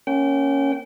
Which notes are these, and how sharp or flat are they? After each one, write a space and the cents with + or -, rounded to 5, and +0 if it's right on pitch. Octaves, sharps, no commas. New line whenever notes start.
A#3 +0 C#4 +0 G5 -30